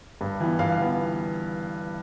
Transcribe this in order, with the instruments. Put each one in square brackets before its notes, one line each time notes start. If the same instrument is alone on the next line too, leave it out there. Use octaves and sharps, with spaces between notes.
[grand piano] G2
E3 B3
G2 F5
E3 B3